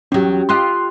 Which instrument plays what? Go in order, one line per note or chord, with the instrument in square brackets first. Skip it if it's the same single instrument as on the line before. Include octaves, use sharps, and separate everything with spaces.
[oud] E2 F#3 [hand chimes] C#4 G4
[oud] F4 G4 D#5 [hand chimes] C6 F#6